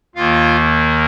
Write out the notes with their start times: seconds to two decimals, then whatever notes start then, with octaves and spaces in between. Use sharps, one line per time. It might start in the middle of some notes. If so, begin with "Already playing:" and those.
0.15 D#2 D#3 A#3 F4 F5